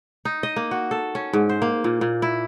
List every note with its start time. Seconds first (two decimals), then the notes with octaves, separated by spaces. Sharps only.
0.25 D#4
0.43 D#5
0.56 A#3
0.71 F#4
0.91 A4
1.15 C#4
1.33 G#2
1.49 C5
1.62 A#3
1.84 A#2
2.01 A#2
2.22 E4